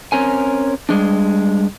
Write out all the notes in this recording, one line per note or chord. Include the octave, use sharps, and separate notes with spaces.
C4 C#4 A#4 G#5
G3 G#3 D4